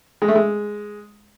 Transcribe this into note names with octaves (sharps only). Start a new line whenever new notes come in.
G#3
A3
G#3